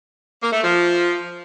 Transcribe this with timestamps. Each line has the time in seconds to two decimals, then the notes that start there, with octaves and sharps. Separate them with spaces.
0.41 A#3
0.52 A3
0.64 F3